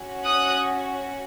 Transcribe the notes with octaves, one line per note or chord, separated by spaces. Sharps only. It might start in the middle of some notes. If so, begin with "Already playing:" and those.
Already playing: C#4 F#4
D#6 F#6